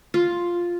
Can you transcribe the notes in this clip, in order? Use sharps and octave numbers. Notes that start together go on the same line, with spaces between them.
F4